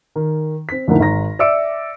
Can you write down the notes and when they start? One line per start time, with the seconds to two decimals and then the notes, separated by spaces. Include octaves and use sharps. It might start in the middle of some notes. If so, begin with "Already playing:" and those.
0.16 D#3
0.69 C4 B6
0.88 F2 A2 D3 A#3 D#4 E4
1.00 G#1 A#5 A#6
1.39 D5 E5 D6 E6 C#7 D7